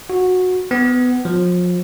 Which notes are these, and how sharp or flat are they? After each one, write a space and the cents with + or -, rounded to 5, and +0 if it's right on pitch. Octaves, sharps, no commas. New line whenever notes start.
F#4 -15
B3 +20
F3 +35